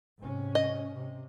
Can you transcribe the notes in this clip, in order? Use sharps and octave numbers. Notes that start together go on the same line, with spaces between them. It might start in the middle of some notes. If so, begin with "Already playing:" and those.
G#2 C3 C#4
D#5
C3